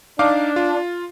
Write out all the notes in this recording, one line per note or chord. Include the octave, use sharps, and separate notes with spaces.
D4 D#4 F5 D6
F4